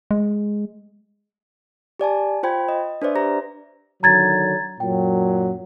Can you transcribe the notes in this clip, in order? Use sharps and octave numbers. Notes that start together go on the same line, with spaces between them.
G#3
G4 D5 G#5 A5
F4 C5 G5 B5 G#6
D#5
D4 B4 C5 D5 E5
G4 C5 A#5 A#6
D3 D#3 F#3 A#5 G#6 A6
F#2 A#2 F#3 G5